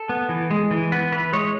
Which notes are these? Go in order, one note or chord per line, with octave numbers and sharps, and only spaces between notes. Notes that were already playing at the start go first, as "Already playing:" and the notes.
Already playing: A4
B3
E3
G#3
E3
B3 B4
E3 B4
G#3 C#5